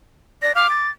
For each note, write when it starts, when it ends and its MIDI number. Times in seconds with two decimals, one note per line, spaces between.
0.42 0.52 74
0.42 0.52 94
0.55 0.67 77
0.55 0.87 86
0.70 0.90 93